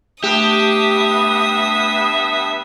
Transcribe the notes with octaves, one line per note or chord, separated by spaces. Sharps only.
G2 A3 B3 G4 E5 D#6